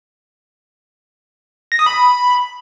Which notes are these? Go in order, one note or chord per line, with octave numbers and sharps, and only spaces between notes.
A#6
D#6
B5